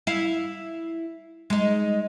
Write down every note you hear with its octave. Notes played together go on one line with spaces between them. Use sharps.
E4 F5
G#3 D#4